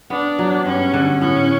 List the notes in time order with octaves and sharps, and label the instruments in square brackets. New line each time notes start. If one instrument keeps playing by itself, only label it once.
[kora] B3 [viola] D4
[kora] F#3
[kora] G2 [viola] C#4
[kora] D3
[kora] A2 [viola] C#4